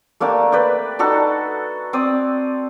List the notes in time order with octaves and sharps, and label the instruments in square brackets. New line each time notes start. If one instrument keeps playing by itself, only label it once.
[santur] A3 A#3 D4 G4
B4 D5 G5
D4 D#4 F#4 A4
C4 C5 D5 D#6